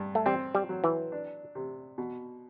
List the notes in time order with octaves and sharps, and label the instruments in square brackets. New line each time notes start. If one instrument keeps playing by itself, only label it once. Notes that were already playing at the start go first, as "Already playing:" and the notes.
Already playing: [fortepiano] G2
[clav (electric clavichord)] A3
[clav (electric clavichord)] G3 [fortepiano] C4
[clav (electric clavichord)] G3
[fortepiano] F#3
[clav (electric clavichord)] E3
[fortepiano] D4
C3
B2